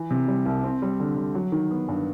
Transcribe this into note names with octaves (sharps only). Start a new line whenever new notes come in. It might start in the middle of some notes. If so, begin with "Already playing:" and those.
Already playing: E3
C3
G3
C2
C4
G3
D3
D3
F#3
D#3
B3
G2